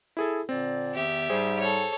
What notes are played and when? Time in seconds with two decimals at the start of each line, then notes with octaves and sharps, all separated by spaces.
0.17 E4 G#4 A4
0.49 A#2 D3 C4 D5
0.95 E2 D#3 B3 G4 E5
1.30 G#2 G3 G#4 C5
1.59 A4 C#5